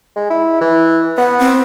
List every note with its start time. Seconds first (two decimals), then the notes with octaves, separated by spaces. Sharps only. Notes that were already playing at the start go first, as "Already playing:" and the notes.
0.16 G#3
0.30 E4
0.61 E3
1.18 B3 F#5
1.39 C4